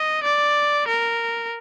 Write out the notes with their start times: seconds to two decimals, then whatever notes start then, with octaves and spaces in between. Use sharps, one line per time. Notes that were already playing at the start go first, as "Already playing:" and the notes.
Already playing: D#5
0.23 D5
0.87 A#4